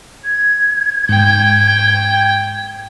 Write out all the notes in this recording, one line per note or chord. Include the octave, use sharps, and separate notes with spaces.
G#6
G#2 G5